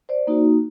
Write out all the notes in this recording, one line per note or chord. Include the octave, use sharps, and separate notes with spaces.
C5 D5
A#3 D#4 F#4